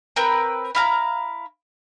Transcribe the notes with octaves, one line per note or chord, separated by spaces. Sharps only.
C4 A#4 B4 G5
E4 F5 A#5